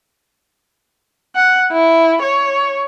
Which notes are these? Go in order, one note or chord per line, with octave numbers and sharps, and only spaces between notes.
F#5
E4
C#5